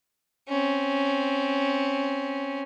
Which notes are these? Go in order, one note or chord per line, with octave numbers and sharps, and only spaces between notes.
C4 C#4